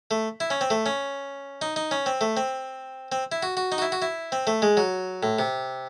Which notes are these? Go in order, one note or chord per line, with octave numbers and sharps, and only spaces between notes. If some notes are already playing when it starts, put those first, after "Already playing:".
A3
E4
C#4
C4
A3
C#4
D#4
D#4
C#4
C4
A3
C4
C4
E4
F#4
F#4
D#4
F#4
E4
F#4
E4
C4
A3
G#3
F#3
A2
C3